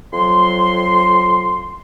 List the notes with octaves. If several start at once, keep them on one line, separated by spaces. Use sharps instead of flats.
F2 F#3 C6